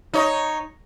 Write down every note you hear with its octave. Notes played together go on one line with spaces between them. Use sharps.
D#4 C#5 D#5